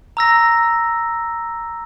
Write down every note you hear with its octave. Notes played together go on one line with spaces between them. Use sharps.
A#5 E6 A#6